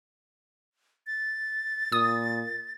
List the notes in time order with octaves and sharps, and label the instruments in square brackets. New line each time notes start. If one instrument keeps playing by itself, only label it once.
[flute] A6
[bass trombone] A#2 [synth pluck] D#6